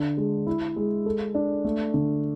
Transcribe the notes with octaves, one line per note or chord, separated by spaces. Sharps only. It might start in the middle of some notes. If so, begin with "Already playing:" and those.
Already playing: D3
G#3
E4
G#3
A4
D4
A3
D3